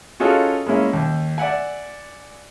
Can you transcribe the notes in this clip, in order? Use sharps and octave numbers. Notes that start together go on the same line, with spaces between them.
C#4 D#4 F4 F#4 G#4 A4
G#3 A#3 C#4 E4
D#2
D5 E5 F#5 G#5